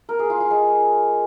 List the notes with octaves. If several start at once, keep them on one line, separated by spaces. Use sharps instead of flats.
A#4
G#4
F4
F4
G#3